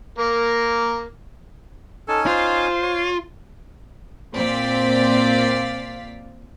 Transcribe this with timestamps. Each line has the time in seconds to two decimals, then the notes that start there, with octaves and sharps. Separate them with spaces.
0.18 A#3 A#4
2.08 C#4 D#4 A4 G#5
2.27 F4 C5
2.82 C#5
4.34 A#2 C4 D5 F5 B6